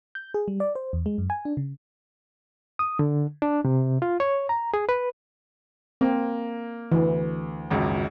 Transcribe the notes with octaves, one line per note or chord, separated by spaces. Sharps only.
G6
G#4
G3
D5
C5
E2
G#3
F#2
G#5
D4
C#3
D#6
D3
D4
C3
F4
C#5
A#5
G#4
B4
A#3 C4
D2 E3
G#1 C#2 F#2